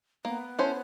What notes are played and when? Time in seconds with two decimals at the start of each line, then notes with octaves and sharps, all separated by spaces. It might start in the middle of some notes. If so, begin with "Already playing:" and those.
0.25 A#3 B3
0.59 C#4 E4 A4 C5